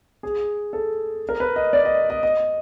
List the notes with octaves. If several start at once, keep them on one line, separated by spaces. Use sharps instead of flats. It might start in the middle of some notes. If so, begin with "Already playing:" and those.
G#4
A4
A#4
B4
D#5
D5
D#5
D#5
D#5